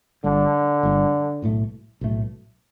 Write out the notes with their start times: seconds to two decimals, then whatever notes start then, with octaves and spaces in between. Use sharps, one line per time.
0.24 G1 G2 D3 G3
0.83 G1 G2 G3
1.42 B1 A2 A3
2.01 B1 A2 A3